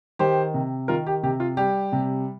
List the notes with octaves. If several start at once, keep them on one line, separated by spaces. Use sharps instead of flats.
D#3 G4 C5
C3
D#3 F4 A#4
G4
C3 G4
F4
G3 G4
C3